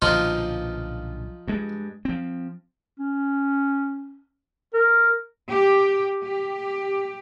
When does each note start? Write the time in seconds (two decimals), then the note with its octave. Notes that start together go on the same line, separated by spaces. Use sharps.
0.02 B1 A#2 D3 F3 D#4 F4
1.48 G2 G#3
2.05 F3 C4
2.99 C#4
4.74 A#4
5.48 G4
6.22 G4